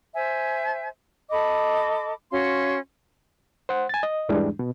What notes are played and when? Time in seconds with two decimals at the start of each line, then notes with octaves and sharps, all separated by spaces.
0.14 C5 E5 G#5
1.30 A4 D#5 B5 D6
2.31 C#4 F#4 F5 C6
3.69 C5 F#5
3.89 G#5 A6
4.03 D#5
4.29 E2 G#2 E3 G3 G#3 D4
4.59 B2